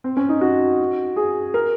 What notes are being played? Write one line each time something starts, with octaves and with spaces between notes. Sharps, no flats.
C4
C#4
D#4
F#4
G#4
A#4